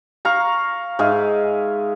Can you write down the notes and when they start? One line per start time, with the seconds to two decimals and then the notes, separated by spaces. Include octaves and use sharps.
0.25 F5 A#5 C#6
0.99 G#2 G#4 E5 F5